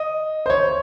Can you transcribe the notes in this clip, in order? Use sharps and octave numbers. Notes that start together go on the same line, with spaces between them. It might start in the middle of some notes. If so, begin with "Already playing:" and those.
Already playing: D#5
C5
C#5